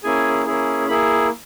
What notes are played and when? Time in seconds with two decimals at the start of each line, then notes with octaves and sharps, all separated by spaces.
0.03 A#3 C#4 E4 G#4 G#5
0.46 A#3 C#4 E4 G#4
0.88 A#3 E4 G#4 B5